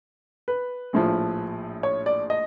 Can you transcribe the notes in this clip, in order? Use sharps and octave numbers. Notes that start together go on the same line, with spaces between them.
B4
A#1 A2 F3
C#5
D5
D#5